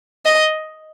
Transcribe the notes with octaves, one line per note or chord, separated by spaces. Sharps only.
D#5